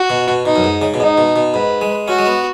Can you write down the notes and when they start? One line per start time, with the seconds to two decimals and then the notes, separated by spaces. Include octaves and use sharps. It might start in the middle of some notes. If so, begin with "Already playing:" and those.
Already playing: F#4
0.10 B2
0.28 B2
0.45 B2 D#4
0.56 F#2
0.64 G#2
0.82 C#3
0.94 B2
1.00 G#2 D#4
1.18 B2
1.36 B2
1.54 G#2 B4
1.81 G#3
2.08 C#4 F#4
2.18 G#3
2.26 B3